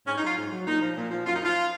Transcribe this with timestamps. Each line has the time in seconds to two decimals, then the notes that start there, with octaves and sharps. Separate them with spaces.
0.06 G#2 C#4
0.17 D#4
0.22 F#3 F4
0.37 G#2
0.52 F#3
0.66 A#2 D#4
0.81 F3
0.96 A#2
1.11 F3
1.26 F#2 F4
1.34 D#4
1.41 F3 F4